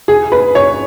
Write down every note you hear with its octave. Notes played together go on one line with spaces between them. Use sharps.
G#4
B4
C#5